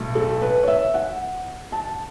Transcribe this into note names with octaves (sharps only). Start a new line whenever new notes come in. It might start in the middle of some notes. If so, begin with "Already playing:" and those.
Already playing: B1 A2 A3
A4
B4
C#5
E5
F#5
A5